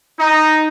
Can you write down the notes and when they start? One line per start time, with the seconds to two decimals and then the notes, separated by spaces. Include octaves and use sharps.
0.18 D#4